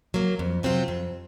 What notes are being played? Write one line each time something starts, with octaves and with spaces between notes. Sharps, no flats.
F#3 A#3
F2
C3 F#3 C4 F4
F2